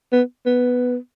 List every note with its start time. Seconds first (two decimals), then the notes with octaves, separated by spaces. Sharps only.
0.12 B3
0.46 B3